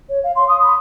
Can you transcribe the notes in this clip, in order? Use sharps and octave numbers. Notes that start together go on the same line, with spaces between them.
C#5
F5
C6
D#6
B5